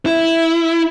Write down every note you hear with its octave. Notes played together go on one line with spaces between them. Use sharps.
E4